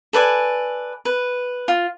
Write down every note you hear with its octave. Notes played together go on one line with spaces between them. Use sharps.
A4 B4 D5 G#5
B4
F4